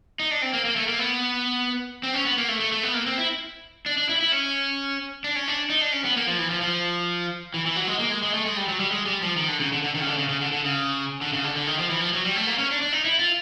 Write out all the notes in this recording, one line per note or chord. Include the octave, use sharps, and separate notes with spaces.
D#4
D4
C4
A#3
A#3
A3
A#3
B3
C4
C#4
B3
A#3
A3
A3
A3
B3
A#3
C4
E4
D4
D4
E4
E4
C#4
D4
C#4
D4
D#4
D4
C#4
B3
A#3
F3
E3
F3
F3
E3
E3
F#3
G#3
A#3
G#3
G#3
A3
G#3
G3
F#3
G3
G#3
G3
F3
D#3
D3
C#3
D3
D3
D#3
C#3
D3
C#3
C#3
D3
D3
C#3
D3
C#3
D3
D3
D#3
F3
E3
F3
F#3
G3
A3
A#3
C#4
D4
D4
D#4
E4
F4